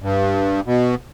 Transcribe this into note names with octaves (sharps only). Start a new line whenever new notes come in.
G2
B2